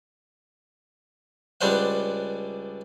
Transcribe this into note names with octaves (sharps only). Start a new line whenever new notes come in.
C#2 G3 D4 B4 C5 F#5